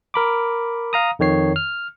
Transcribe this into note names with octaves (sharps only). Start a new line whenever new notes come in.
A#4 B5 D6
F5 A#5 D#6
F2 D#3 C#5 C7
F6